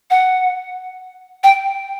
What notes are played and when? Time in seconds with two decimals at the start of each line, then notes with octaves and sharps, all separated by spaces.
0.11 F#5
1.44 G5